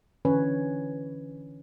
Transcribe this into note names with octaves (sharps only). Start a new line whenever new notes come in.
D3 E3 C#4 B4 C#5